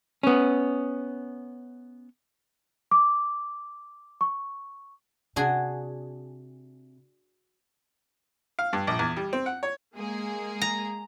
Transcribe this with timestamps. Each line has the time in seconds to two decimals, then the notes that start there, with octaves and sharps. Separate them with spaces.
0.23 B3 C#4
2.91 D6
4.21 C#6
5.36 C3 D4 F#4 G#4
8.59 F5
8.73 G2
8.87 A#1
8.99 E2
9.17 G3
9.33 C4
9.46 F#5
9.63 C#5
9.95 G#3 A#3 G#4
10.61 A#5